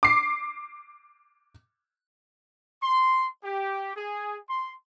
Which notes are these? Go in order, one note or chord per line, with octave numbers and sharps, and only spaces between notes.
D6 C7
C6
G4
G#4
C6